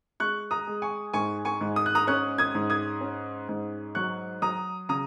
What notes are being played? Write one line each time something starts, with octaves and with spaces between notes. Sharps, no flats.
G#3 C#6 F#6
A#5 D#6
G#3
G#5 C#6
G#2 G#5 C#6
G#5 C#6
G#2
D#6
F#6
A#5 D#6
C#4 C#6 F#6
D#6 G#6
G#2
D#6 G#6
C#4
G#2
F#3 C#6 F#6
F#3 A#5 D#6
C#3 A#5 D#6